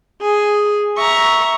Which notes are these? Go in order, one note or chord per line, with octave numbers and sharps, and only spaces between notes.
G#4
E5 A#5 C#6